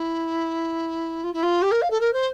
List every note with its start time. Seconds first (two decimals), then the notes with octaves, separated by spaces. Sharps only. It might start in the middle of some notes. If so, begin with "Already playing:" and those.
Already playing: E4
1.23 F4
1.33 E4
1.42 F4
1.61 G4
1.71 A#4
1.81 F5
1.90 A4
2.00 A#4
2.13 C5